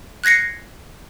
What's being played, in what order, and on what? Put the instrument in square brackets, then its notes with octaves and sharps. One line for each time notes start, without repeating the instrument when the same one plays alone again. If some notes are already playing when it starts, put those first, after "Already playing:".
[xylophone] F#6 G#6 A#6 C7 C#7